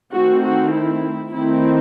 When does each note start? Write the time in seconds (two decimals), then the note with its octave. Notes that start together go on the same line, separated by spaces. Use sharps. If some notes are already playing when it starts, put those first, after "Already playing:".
0.13 D#3 A3 C4 F#4
0.44 F#4
0.73 E4
1.32 D#3 A3 C4 E4